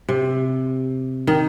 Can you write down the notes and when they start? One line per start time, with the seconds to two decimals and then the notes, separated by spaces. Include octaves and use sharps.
0.09 C3
1.27 D#3